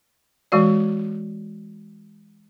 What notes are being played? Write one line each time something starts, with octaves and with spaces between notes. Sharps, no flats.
E3 G#3 F#4 D5